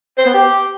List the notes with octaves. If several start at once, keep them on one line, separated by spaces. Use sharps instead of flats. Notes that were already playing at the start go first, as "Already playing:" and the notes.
C5
B3
G4